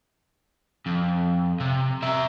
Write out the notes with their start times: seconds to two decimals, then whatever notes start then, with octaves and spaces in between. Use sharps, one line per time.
0.87 F2
1.60 C3
2.03 A#4 E5